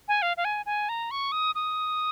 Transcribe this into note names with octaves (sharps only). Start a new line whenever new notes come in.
G#5
F5
F5
G#5
G#5
A#5
C#6
D#6
D#6